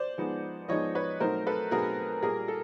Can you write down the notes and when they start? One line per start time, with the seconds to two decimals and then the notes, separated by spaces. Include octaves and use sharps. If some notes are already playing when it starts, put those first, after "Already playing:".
Already playing: C5 D5
0.18 F3 G#3 B3 D#4
0.68 F3 G#3 B3 D#4 C#5 D#5
0.95 B4 C#5
1.20 B2 F#3 A3 C4 D#4 A#4 C5
1.46 A4 B4
1.71 B2 F#3 A3 C4 D#4 G#4 A#4
2.23 A#2 G3 A#3 G#4 A#4
2.48 A4